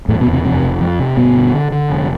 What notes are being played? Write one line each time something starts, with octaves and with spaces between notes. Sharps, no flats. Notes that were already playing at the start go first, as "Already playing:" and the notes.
E2 A2 A3
B2 B3
E2
C3 C4
F2 C3 C4
F1
F2
C3
G1 B2 B3
D3
D3
D3
F1